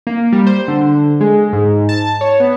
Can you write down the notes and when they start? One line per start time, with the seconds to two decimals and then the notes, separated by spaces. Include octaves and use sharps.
0.07 A#3
0.33 G3
0.47 C5
0.68 D3
1.21 G#3
1.53 G#2
1.89 A5
2.21 C#5
2.40 B3